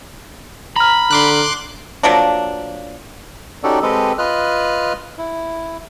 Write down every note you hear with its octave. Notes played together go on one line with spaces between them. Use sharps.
A#5 B5 F6
D3 C6 D6 F#6
F3 F#3 A#3 D4
C#4 D#4 F#4 G4 A4 D5
G#3 C4 G4 A4 B4 D#5
F4 B4 D#5 F6 F#6
E4